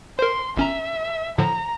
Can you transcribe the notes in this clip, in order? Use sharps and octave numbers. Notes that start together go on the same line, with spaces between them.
A#4 C5 C6
G1 C#4 E5 A#5
A2 D3 F3 A#5